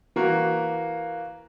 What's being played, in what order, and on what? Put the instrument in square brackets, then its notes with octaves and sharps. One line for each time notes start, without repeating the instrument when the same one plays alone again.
[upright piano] E3 A#3 F#4